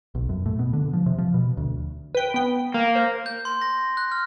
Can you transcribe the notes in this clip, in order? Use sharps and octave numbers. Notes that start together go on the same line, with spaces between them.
B1
F#2
A2
B2
D3
F3
C3
F3
B2
D2
B4 G5
B3 G5
A#3
C5
G6
C6
A#6
F#6
F6